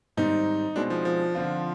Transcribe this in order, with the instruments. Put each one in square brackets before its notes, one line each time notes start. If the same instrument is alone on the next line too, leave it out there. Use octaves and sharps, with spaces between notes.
[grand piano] G#2 D#3 G3 C4 [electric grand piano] D#4
[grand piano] B2 G#3 C4 D#4 [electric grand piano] D4
[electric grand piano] F3
F3
[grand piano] D3 F3 C4 F4